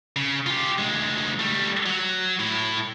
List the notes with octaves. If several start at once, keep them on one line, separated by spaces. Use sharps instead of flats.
C#3
F4 G4
D2 G#3
G3 A3
F#3
A2 E4